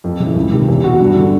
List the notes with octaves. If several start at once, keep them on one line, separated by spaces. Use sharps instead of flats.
F2
C#3 E3
C#2
C3 D#3
E2
B2 F#4
G2
D3